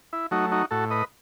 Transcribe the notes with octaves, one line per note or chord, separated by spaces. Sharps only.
E4
F#3 A3 D#4 F#4
D#4 F#4
A2 F#4 A4
B4 D#5